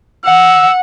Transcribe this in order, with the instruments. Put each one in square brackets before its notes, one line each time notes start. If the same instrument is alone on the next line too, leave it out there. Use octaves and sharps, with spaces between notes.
[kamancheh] F#5 [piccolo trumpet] E6